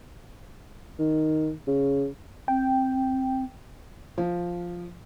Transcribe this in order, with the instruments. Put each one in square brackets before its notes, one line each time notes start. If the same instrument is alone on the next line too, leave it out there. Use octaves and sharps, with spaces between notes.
[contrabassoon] D#3
C#3
[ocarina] C4 [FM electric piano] G5
[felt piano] F3